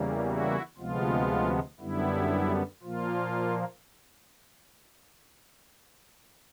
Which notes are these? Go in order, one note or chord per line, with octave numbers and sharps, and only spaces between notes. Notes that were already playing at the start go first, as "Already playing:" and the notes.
Already playing: E2 C#3 E3 G3 A#3
E4 F#4
D2 C3 F3 G#3 B3 F4
F#2 D3 G3 B3 E4
A#2 F3 A#3 F4